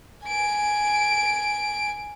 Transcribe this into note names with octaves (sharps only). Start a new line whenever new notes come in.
G#5 D7